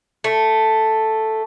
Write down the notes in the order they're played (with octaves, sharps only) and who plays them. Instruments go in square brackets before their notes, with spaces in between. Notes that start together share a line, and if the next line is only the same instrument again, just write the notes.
[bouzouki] A3